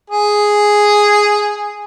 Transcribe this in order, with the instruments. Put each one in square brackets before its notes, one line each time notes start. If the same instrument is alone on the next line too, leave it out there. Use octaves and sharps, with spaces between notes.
[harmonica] G#4